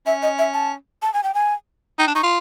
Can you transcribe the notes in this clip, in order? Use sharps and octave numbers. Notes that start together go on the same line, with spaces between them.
C#4 E5
D#5
E5
A5
A5
G#5
G5
G#5
D#4 G5
D4
D#4 C#6
F4